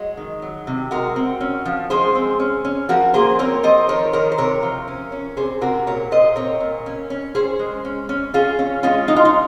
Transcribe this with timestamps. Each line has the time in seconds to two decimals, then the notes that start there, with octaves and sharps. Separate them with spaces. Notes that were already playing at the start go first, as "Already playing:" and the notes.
Already playing: F#3 G#3
0.17 D#3
0.42 F#3
0.67 C3
0.91 G#3 F#4 A#4
1.16 C4
1.41 C#4
1.65 F3
1.90 G#3 G#4 C5
2.15 C4
2.40 C#4
2.65 C#4
2.89 F3 F#4 A#4
3.14 A#3 G#4 C5
3.39 C4 A#4 C#5
3.63 F3 C5 D#5
3.88 D#3 A#4 C#5
4.13 D#3 A#4 C#5
4.32 C5
4.38 C3 A#4 C#5
4.63 F3
4.88 C#4
5.12 C#4
5.37 C3 G#4 C5
5.61 C3 F#4 A#4
5.87 A#2 A#4 C#5
6.11 A#2 C5 D#5
6.36 C4 A#4 C#5
6.60 A#2
6.86 C#4
7.10 C#4
7.35 C#4 G#4 C5
7.59 G#3
7.85 C#4
8.09 C#4
8.34 C#4 F4 G#4
8.59 C#4
8.83 G#3 C#4 F4
9.08 G#3 D#4
9.16 F4
9.25 D#4